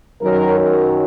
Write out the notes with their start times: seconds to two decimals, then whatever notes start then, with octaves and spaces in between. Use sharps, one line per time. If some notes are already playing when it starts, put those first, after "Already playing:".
0.21 F#2 D#3 F#3 A#4
0.59 A#4